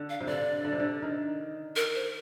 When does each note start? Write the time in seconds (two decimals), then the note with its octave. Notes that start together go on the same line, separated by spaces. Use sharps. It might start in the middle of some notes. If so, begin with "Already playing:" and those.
Already playing: D3
0.09 F5
0.21 C3
0.27 D3 D5
0.65 D3
0.73 C3
0.80 D3
1.02 D#3
1.76 A#4
1.95 C5